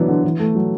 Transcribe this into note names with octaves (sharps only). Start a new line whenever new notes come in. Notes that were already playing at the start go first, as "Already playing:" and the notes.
Already playing: E3 F#3 B3 D4
D3
E3
A3
F#3